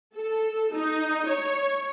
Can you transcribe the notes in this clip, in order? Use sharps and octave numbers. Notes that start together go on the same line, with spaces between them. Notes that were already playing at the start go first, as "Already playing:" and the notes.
A4
D#4
C#5